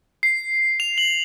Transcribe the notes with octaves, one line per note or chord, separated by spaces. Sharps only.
C7
F7
F#7